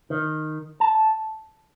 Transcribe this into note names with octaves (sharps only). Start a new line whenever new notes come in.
D#3
A5